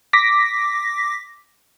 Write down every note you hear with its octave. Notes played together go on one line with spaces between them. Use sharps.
D6 A#6 B6